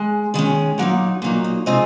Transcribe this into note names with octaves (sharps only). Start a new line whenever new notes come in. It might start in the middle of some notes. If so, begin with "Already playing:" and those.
Already playing: G#3
D#3 G#3 C#4
A#2 F#3 A#3 D#4 F#5
A#2 F#3 A#3 D#4
D#5
C3 F3 G#3 C4 D#4 D#5